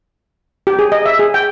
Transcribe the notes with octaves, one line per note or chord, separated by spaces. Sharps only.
G4
G#4
D#5
E5
G#4
G5